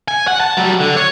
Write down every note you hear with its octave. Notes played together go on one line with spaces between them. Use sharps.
G#5
F#5
A5
F#3 G3
D3
C#5